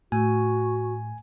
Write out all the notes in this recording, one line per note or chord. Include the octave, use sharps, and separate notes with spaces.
A2 F#4 G#5